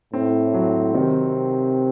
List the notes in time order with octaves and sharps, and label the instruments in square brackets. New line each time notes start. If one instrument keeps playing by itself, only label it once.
[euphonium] A2 [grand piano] C4
[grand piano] F#3
[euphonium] C3 [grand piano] D#3